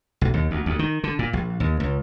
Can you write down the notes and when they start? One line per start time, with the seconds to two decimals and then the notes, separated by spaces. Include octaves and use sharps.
0.21 B1
0.34 D#2
0.51 D2
0.66 D2
0.79 D#3
1.04 D3
1.19 A#2
1.33 A#1
1.60 D#2
1.80 C#2